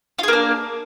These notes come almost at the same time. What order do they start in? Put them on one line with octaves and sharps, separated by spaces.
F4 G#4 A#3 D4